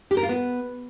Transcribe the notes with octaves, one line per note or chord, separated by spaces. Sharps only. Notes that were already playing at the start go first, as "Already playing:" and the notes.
G4
A#4
F4
B3